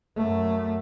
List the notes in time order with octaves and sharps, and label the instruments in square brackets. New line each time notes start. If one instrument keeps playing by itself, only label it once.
[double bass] F#2 A3